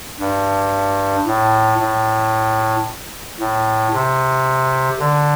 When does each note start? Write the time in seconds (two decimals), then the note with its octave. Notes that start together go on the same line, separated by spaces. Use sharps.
0.20 G2
1.27 A2
1.80 A2
3.40 A2
3.93 C3
4.99 D3